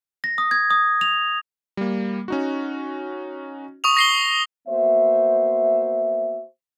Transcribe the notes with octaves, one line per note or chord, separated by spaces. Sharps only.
A#6
D#6
G#6
D#6
F7
G3 A#3
C#4 D#4 F#4
C#6 D#6 F7
A#6 C7 G7
A#3 B3 F#4 C5 E5